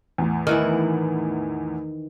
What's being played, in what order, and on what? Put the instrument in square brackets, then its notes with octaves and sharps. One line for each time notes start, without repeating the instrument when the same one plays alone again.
[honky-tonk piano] E2 A2
[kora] D#3 E3 E4